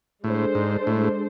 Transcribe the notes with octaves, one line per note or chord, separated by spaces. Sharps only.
A2 G#3 D4 A4 C5
G#2
A2